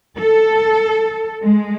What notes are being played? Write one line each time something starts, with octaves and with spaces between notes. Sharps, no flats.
A4
G#3